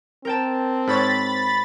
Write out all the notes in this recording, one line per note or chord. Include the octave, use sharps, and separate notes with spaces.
C4 A#4 G5 A5
G#2 C#5 B5 A6